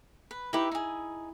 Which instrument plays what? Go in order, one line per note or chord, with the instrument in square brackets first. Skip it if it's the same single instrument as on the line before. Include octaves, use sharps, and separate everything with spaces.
[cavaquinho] B4
[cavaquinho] D#4 G4 B4 [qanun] E4 E5
[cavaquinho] D#4 G#4